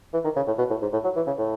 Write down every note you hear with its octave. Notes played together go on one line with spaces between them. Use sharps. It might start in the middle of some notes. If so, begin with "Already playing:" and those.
E3
D#3
C#3
A2
B2
A2
G#2
A2
F#3
E3
C#3
A2